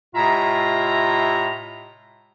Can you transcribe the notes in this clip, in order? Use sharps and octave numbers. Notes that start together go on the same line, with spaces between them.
A2 C3 G#3 F4 E5 A#5